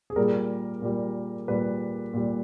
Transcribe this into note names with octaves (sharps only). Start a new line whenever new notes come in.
G#4
A#2 G3 A#4
A#2 G3
A#2 G3 B4
A#2 G3